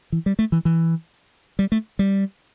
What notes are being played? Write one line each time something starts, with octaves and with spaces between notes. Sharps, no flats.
E3
G3
A3
E3
E3
G3
A3
G3